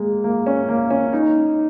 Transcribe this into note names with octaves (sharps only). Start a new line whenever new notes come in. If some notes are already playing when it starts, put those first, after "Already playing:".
Already playing: G#3 A#3
A#3
C#4
A#3
C#4
D#4